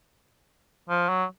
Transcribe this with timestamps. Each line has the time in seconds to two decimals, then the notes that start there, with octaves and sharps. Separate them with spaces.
0.89 F3
1.09 F#3